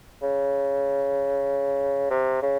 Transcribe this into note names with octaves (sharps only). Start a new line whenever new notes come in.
C#3
C3
C#3